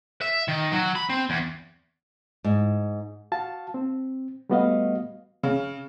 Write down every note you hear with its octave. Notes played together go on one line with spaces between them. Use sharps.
E5
D#3
F#3
B5
C4
E2
G#2
F#4 F5 A5
C4
G3 A3 B3 F#4 D#5 F5
C#3